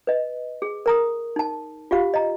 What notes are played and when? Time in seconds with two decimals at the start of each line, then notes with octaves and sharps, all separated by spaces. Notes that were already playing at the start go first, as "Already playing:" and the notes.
0.07 B4 D#5
0.62 G#4
0.86 A#4 A#5 D#6
1.36 D#4 A5
1.91 F4 G4 F5
2.14 D#5 A#5